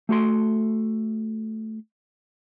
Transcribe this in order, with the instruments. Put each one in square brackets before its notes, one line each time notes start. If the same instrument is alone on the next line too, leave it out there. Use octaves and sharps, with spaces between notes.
[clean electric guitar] A3 F#4 A4 C6